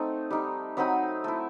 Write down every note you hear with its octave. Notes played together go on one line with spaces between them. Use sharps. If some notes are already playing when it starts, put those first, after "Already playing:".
Already playing: A3 C4 D#4 D#5
G3 D#4
F#3 C4 D#4 B5 D#6
A3 E4